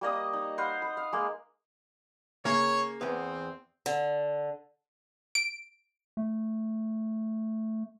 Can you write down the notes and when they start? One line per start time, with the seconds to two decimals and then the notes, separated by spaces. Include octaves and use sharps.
0.01 G3 A#3 D#5 D#6
0.33 D#4
0.58 B4 C5 F5 F#5
0.82 B4
0.97 F5
1.13 G#3 A#3
2.45 C#3 A#3 C#5
3.01 E2 B3 C4
3.86 D3
5.35 D7
6.17 A3